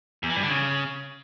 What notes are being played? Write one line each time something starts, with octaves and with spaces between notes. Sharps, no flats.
E2
E3
G2
D3
C#3